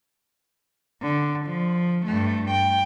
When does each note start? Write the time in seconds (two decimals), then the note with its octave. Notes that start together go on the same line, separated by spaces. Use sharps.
1.02 D3
1.46 F3
2.06 G2 A3
2.51 G5